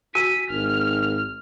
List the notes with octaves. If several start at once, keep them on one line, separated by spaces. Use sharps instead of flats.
F#4 G#5 B6
G#1 F6